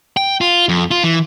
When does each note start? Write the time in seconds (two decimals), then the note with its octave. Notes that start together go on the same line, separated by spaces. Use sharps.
0.17 G5
0.41 F4
0.69 F2
0.91 F4
1.04 E3